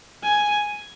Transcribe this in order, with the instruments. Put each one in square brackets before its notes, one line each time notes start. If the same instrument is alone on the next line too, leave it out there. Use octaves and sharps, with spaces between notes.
[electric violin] G#5